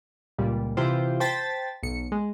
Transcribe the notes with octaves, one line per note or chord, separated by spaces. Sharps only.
C#2 A#2 G3
C3 E3 E4 F4 G4 C5
C5 G5 A5 A6 B6
B1 C#7
G#3